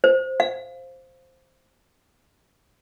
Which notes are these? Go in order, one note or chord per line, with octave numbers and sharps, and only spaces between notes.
C5
F5